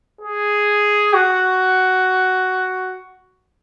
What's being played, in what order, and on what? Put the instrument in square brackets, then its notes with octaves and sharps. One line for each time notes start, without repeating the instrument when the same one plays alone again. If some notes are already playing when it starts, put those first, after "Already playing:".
[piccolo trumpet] G#4
F#4